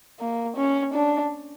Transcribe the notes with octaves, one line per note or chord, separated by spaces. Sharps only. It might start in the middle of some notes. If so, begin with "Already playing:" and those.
A#3
C#4
D4